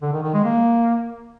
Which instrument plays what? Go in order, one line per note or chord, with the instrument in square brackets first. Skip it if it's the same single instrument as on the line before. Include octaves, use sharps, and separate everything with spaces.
[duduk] D3
D#3
D#3
G#3
A#3